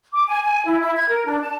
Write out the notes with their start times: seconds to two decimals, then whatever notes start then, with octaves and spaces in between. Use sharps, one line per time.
0.12 D6
0.27 G#5
0.42 G#5
0.66 E4
0.80 E4
0.96 G#6
1.08 A#4
1.25 D4
1.41 A5